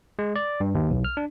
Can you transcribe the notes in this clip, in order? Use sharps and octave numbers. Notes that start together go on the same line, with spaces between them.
G#3
D5
G2
D#2
B1
F6
D4